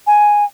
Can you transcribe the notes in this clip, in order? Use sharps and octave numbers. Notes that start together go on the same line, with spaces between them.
G#5